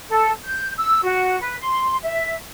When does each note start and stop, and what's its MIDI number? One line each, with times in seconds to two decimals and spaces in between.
0.08 0.30 69
0.44 0.71 91
0.77 1.00 88
1.04 1.37 66
1.39 1.55 71
1.60 1.95 84
2.02 2.34 76